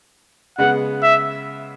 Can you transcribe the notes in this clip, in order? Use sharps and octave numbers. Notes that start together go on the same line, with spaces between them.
C#3 G#3 B3 F#5
E5